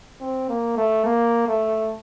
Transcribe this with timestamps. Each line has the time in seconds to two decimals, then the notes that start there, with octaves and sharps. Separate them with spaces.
0.21 C4
0.49 A#3
0.77 A3
1.05 A#3
1.47 A3